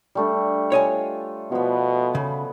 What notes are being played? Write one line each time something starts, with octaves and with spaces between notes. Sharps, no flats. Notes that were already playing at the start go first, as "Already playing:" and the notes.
G3 A3 D4
F4 C#5 D#5 G#5
B2 F3 B3
C#3